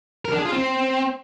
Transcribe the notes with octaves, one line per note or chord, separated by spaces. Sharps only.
A#4
D4
G#4
F4
C4